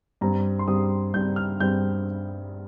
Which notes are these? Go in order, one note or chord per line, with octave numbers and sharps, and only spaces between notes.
G2 G3 C4 A#5
C6
G2 G3 C4 D#6
G2 G3 C4 G6
F6
G2 G3 C4 G6